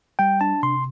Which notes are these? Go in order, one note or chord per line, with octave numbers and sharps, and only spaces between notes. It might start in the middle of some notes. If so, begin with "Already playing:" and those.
G3 G5
D4 A5
C3 C6